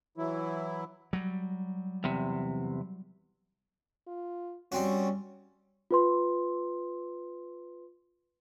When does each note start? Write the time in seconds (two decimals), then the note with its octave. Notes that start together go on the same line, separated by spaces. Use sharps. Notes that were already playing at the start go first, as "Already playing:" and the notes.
0.17 E3 F#3 E4
1.13 F#3 G3
2.04 E2 C3
4.07 F4
4.72 G3 C4 C#4 F#4
5.91 F4 B4 C6